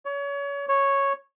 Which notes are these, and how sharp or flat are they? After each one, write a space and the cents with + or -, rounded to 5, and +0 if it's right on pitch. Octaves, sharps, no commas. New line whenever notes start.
C#5 +30
C#5 -5